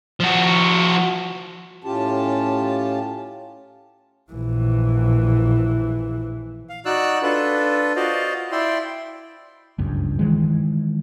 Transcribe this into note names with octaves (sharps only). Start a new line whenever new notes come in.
F3 F#4
A2 C#4 F4 G4 A5
A#1 E3
F5
D#4 F#4 D5 E6 F#6
D4 F4 A4 B4
F4 F#4 C5 D5 D#5 F5
E4 D5 E5 G5 C6
F#1 C#2 G2
D#3 E3 G#3